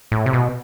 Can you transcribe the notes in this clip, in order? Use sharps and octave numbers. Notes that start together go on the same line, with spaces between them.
A2
C3
B2